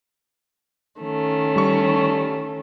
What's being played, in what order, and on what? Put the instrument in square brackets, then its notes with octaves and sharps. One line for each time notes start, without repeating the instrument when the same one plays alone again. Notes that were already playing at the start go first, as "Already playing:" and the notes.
[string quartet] D#3 A3 C#4
[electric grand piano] G3 C#6